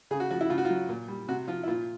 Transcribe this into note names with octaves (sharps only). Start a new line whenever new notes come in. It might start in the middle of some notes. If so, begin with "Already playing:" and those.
C#3 G#4
F#4
F3 F#4
E4
C#3 F4
F#4
F4
F#3
A#2
G3
C3 F#4
F3 F4
E4
A#2 F4